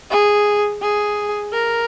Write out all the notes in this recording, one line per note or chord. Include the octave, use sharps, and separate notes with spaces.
G#4
G#4
A#4